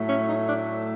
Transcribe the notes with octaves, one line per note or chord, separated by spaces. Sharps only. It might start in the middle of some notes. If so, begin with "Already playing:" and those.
Already playing: A2 F#3 A3
C#4
D#4
D4